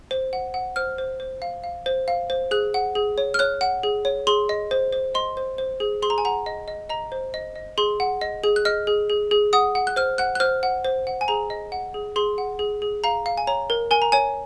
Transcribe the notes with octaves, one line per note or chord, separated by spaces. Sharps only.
C5
F#5
F#5
C5 F6
C5
C5
F5
F5
C5
F5
C5
G#4 F#6
F#5
G#4
C#5
F6
C#5 F#6
F#5
G#4
C#5
G#4 C6
D#5
C5
C5
D#5 C6
C5
C5
G#4
G#4 C6
A#5
G#5
F#5 A#5
D#5
D#5
D#5 A#5
C5
D#5
D#5
G#4 C6
F#5
D#5
G#4
F#6
D#5 F6
G#4
G#4
G#4
F#5 D#6
F#5
F#6
C5 F6
F#5 F#6
F#6
C5 F6
F#5
C5
F#5
G#5
G#4 A#5
D#5
F#5
G#4
G#4 C6
F#5
G#4
G#4
F5 A#5
F5
G#5
C#5 A#5
A#4
A#4 G#5
A#5
C#5 G#5